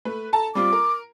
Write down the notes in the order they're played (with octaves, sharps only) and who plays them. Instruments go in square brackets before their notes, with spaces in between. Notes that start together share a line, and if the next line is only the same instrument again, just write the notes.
[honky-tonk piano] A3 B4
A4 A5 A#5
[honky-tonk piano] G3 C4 F4 [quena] D6
[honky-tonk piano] A#4